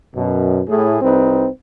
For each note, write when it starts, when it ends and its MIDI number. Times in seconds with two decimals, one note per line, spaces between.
0.16 0.61 42
0.16 0.61 47
0.68 1.00 45
0.68 1.00 68
1.02 1.46 36
1.02 1.46 60
1.02 1.46 63
1.02 1.46 71